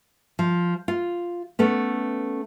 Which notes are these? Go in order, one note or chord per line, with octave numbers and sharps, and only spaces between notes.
F3
F4
A3 B3 C#4